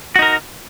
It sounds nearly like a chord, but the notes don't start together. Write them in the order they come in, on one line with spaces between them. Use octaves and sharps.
F#4 D#4 A#4